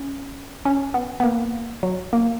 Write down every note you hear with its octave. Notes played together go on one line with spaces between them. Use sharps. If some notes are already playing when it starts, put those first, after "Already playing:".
Already playing: C#4
C#4
B3
B3
A#3
F#3
A#3